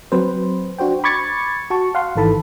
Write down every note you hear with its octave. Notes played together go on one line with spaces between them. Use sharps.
F#3 C4 B4 C5
D4 F#4 C5 G5
B5 C#6 D6 G#6 A6 C#7
F#4 A5 C#6
F5 F#5 C6
G#1 D#3 E3 A4 A5 B5